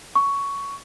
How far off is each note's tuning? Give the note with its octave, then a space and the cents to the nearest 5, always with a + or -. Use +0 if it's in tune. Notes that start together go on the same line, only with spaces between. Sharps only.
C#6 +10